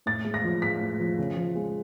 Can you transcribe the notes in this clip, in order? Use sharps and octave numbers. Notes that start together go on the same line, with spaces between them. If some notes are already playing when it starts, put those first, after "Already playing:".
A2 A6
G#3
A#6
F3
G#3 B6
A2
F3
C#3
F3
G#3